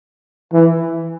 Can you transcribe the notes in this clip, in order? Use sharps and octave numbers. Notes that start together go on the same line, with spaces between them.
E3